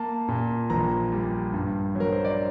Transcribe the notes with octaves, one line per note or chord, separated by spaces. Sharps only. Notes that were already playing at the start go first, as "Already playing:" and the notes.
Already playing: A#3 A5
A#2
A#1 A#5
G3
G2
F#3 A#4
C5
D5